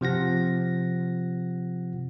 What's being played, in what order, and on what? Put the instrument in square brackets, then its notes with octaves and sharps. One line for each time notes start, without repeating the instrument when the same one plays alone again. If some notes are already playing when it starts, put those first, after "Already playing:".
[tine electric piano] C3 F3 F#5 A#6